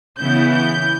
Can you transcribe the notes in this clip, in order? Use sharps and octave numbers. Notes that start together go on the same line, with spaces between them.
C#3 E3 B3 E4 G6
G6